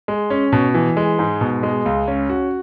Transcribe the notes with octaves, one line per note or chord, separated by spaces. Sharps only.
G#3
C#4
B2
E3
G#3
G#2
B2
G#3
C#2
C#4
F#4